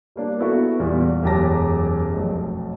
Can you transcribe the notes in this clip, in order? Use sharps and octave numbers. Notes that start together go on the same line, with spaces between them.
G3 A#3 D4
B3 E4 F#4 A4
E2 A#2 G3
E1 F#2 G4 A5 A#5 A#6
F1 B1